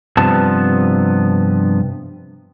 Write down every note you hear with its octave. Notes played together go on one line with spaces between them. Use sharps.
G2 C3 F3 B3 A5